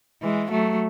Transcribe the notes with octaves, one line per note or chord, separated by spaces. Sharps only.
E3 G#3
F#3 A3